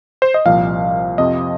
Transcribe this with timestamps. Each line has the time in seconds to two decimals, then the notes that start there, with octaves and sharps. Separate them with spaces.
0.22 C5
0.34 D#5
0.46 C2 A#2 F3 F5
1.18 F2 C3 F3 D#5